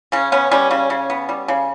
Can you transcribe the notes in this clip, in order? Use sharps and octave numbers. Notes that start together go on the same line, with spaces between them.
C#3 C#4
B3 C#4
G3 C#4
C#3 C#4
C#3
B3
G3
C#3